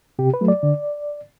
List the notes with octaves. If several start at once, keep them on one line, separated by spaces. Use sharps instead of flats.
C3 G4
B4
F#3 A3
D5
D3